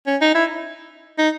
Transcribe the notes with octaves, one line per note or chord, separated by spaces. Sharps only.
C#4
D#4
E4
D#4